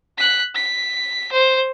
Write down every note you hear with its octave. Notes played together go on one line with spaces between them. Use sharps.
F#6 B6
B6
C5